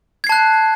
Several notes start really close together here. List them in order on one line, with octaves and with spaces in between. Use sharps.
G#6 C7 A5 F#6